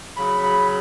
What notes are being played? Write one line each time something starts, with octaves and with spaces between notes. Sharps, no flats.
C#3 F#3 B5
B5